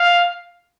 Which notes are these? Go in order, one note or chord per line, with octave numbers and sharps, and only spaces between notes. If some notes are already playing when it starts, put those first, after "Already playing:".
Already playing: F5